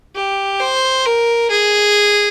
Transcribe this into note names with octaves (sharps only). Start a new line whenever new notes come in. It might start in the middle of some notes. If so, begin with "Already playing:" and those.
G4
C5
A#4
G#4